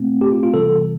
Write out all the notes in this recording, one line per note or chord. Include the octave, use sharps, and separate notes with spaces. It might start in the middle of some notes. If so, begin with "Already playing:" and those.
Already playing: B2 A3 C4
G4
F4
F4
C3 E3 G3 B3 A4